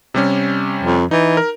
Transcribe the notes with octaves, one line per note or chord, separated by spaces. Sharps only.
C3 G3 C#4
F2
E3 D#4
A#4